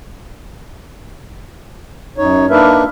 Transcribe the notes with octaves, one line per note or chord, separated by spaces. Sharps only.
F#2 D#4 C#5
A#3 D4 D#4 A#4 B4 E5